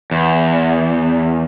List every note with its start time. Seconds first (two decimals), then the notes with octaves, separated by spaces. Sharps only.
0.11 E2